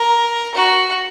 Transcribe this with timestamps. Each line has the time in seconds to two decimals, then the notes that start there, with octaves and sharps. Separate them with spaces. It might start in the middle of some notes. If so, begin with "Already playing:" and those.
Already playing: A#4
0.55 F#4